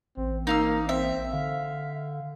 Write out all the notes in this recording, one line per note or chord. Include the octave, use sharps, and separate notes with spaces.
A1 C4
A#3 D#4 F5 E6
C4 E5
D3 F5